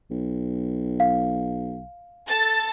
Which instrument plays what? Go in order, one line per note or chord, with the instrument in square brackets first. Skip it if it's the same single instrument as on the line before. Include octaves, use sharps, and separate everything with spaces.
[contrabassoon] B1
[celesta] F5
[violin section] A4 A5 A6